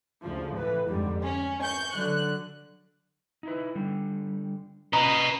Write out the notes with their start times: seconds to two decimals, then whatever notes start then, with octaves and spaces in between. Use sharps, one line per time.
0.22 D2 C#3 F3
0.56 A2 E3 B4
0.88 F2 G#2 D3 G3
1.22 C#4
1.63 C#6 G6
1.94 D3 F#3 F#6
3.43 D#4 E4 B4
3.75 D3 G3
4.93 C#4 B4 D#5 A#5 D#6